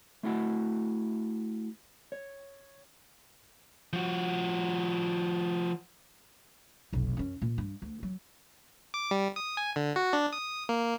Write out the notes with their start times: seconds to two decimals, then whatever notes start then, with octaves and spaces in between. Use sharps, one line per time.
0.23 A3 E4 F#4 F#5
2.12 C#5
3.93 F3 F#4
6.93 F1 B1
7.17 F#2 C#4
7.42 A#2
7.58 G2
7.82 D2
8.03 F#3
8.94 D6
9.11 G3
9.36 D#6
9.57 G#5
9.76 D3
9.96 F#4
10.13 D4
10.33 D#6
10.69 A#3